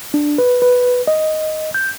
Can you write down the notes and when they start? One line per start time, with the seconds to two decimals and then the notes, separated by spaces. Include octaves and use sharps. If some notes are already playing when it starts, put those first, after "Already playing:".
0.14 D4
0.38 B4
0.62 B4
1.07 D#5
1.74 G6